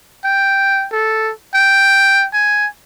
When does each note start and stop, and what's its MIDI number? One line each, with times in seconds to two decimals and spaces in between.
0.24 0.87 79
0.92 1.32 69
1.54 2.26 79
2.34 2.67 80